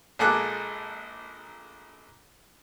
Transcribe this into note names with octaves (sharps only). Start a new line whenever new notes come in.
A#1 G#3 A#3 A4 D6 F#6